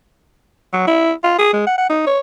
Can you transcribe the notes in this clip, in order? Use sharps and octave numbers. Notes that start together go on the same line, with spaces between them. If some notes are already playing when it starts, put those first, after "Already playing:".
F#3
E4
F4
G#4
G#3
F#5
F#5
D#4
C#5